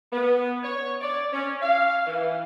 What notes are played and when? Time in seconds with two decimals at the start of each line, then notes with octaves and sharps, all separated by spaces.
0.12 B3
0.63 C#5
1.01 D5
1.32 C#4
1.62 F5
2.07 E3